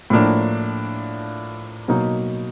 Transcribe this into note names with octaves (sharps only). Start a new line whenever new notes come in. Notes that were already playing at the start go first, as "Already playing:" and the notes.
A2 F3 A#3 D4
B2 F#3 A#3 D#4